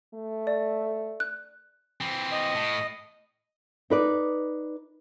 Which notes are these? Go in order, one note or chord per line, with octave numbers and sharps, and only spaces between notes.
A3
D5
F#6
E3 C4
D#5
A2
D#4 B4 D5